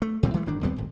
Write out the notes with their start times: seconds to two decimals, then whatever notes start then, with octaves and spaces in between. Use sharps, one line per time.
0.02 A3
0.23 D2 A#2 G3 C4
0.34 E3 G#3 A3
0.46 G1 A2 D#3 D4
0.63 D#2 G3 B3 C4
0.76 D1 G#1